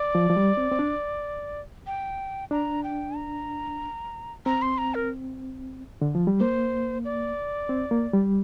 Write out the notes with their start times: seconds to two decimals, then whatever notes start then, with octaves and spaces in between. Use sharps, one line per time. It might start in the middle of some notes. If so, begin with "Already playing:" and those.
Already playing: D5
0.15 F3
0.30 F3
0.37 G3
0.57 C4
0.71 C4
0.79 D4
1.87 G5
2.51 D4 A#5
2.84 G5
3.16 A#5
4.46 C4 A#5
4.62 C6
4.78 A#5
4.95 A#4
6.02 D3
6.15 F3
6.27 G3
6.40 A#3 C5
7.05 D5
7.69 C4
7.91 A#3
8.13 G3